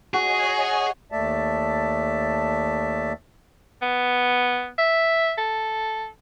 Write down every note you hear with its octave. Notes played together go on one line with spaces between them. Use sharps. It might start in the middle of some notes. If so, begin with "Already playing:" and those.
F#4 G#4 C#5 D#5 G#5
D#2 A3 D5 E5 A5
B3
E5
A4